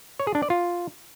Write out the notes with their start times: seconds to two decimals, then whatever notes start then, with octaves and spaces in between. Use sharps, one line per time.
0.20 C#5
0.27 G#4
0.35 D4
0.42 D5
0.50 F4